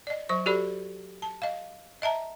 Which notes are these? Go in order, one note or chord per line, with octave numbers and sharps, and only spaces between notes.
D5 D#5
F#3 C5 C#6
F#4 G4 A4 D5 B5
A5
D#5 F5
D#5 E5 A5 A#5